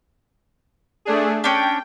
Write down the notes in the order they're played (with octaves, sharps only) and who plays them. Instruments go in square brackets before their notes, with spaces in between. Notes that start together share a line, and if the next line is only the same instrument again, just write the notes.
[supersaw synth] A3 D4 G#4
[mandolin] C#4 D4 [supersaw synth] G5